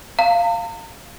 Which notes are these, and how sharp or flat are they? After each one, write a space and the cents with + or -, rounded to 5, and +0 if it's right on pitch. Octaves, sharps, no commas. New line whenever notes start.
F5 -5 A#5 -45